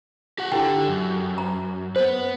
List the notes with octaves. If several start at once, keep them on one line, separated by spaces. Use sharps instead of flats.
G4 F#5
D3 E4 G4 A4 G5
F#2
A#5
B3 B4 C5